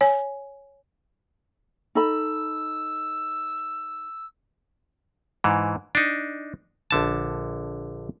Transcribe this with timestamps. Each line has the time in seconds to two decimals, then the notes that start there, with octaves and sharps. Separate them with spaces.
0.01 C#5 G#5
1.95 D#4 A4 B5 E6
5.44 G#2 E3
5.95 D4 D#4
6.91 A#1 D3 A5